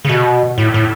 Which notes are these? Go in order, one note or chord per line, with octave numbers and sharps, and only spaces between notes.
C#3
B2
A2
A2